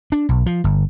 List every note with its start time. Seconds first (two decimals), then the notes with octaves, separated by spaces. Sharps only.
0.12 D4
0.29 B1
0.46 F3
0.64 G1